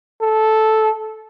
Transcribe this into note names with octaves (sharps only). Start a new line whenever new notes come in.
A4